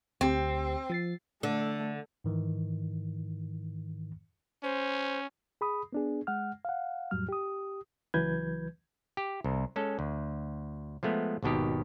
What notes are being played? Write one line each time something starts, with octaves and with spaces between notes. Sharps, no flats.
D2 C4 G4
F3 A6 C7
D3 A3
G#2 D#3 E3
C#4 C5
G#4 B5 D#6
B3 D4 G#4
G#3 F#5 F6
F5 F#5
F2 A2 F#3 G3 F6
G4 D#6
C#2 E3 F#3 B4 G6 G#6
G4
C2
G#3 C#4 A4
D2
F3 G#3 A3 B3
G#1 D#2 B2 D#3 G4